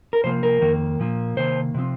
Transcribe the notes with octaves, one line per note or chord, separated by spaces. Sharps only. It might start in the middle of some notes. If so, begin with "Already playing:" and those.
A#4
C3 F3 A#3 C5
A#4
F2 D#3 A#3
A#2 F3 A#3
C3 D#3 A#3 C5
C3 F3 C4